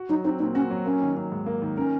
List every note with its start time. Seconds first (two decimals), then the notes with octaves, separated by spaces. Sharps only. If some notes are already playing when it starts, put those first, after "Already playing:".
Already playing: F#4
0.09 F#3 D#4
0.24 C4 D#4
0.39 A#2 D#4
0.55 C#4 F#4
0.70 F#3
0.85 A#3 C#4
1.01 D#3
1.17 F#3
1.32 G#2
1.46 A#3
1.62 D#3
1.77 C#4 A#4